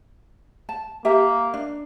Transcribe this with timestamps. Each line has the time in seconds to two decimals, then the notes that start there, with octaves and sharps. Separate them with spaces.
0.69 A5
1.05 A#3 G4 E5
1.54 D4